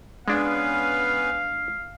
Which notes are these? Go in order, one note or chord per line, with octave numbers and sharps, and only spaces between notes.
G#3 B3 C#4 D4 B4 F5